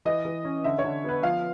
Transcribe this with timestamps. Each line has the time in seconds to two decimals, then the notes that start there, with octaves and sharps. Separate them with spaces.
0.05 E3 D#5
0.25 E3
0.45 C#4
0.64 D3 E5
0.78 C#5
0.84 D3
1.04 B3 B4
1.23 F3 F5